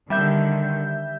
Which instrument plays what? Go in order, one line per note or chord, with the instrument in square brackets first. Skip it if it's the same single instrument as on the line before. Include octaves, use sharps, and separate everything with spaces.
[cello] D3 D#3 [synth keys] G3 E5 G6